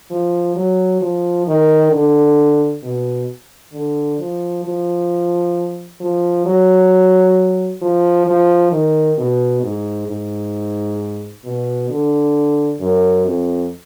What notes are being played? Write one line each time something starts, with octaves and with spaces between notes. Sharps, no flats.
F3
F#3
F3
D#3
D3
B2
D3
F3
F3
F3
F#3
F3
F3
D#3
B2
G#2
G#2
B2
D3
F#2
F2